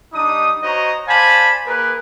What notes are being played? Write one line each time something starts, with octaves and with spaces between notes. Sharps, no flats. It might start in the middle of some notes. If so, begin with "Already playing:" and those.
G3 D4 D#4 D#6
F#4 C5 C#5 D#5 A#5
C5 D5 F5 G#5 A5 B5
A#3 G#4 A#4 B4